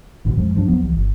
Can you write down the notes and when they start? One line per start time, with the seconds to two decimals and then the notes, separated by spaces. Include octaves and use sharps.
0.25 A1 G#2 B2 D3
0.37 F2 F3 G#3
0.55 G2 F3 D4
0.68 E2 F3 F#3 B3
0.83 C2 E3
0.95 G1